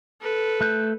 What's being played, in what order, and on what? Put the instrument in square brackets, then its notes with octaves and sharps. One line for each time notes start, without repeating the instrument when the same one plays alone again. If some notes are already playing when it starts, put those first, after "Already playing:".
[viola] A4 B4
[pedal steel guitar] A3 F#6 G6